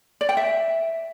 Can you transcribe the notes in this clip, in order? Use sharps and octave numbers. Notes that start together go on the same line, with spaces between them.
D5
G5
E5